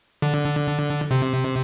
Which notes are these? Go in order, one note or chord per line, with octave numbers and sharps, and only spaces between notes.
D3
C3